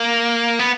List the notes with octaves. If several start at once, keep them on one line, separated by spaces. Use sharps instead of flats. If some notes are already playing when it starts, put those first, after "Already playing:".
Already playing: A#3
B3